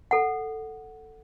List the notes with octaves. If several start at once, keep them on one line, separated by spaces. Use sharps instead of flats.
A4 F#5